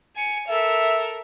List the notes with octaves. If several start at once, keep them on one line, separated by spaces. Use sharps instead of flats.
G#5 C#7
A4 A#4 E5